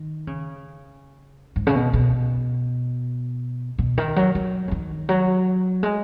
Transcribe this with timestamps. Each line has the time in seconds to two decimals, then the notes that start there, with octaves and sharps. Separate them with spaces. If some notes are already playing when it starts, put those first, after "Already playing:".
Already playing: D#3
0.27 C#3
1.56 G#2
1.67 C#3
1.75 B2
1.93 B2
3.78 B2
3.98 D#3
4.16 F#3
4.35 F#3
4.68 C#3
4.71 D#3
5.09 F#3
5.83 G#3